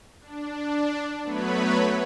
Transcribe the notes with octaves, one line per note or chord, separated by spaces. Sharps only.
D4
F#3 A3 B3 B4 C#5 B5